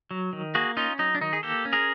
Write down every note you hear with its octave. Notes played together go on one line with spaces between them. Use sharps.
F#3
D#3
A#3 F#4 G#4
C#4 D#4 F4
F#3 D#4
D4
D#3 D#4
G#4
A#3 G4 A4
C#4
G#4 A#4